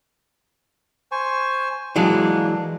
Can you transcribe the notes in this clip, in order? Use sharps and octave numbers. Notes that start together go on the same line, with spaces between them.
C5 G#5 C#6
E3 F#3 G#3 A#3 D4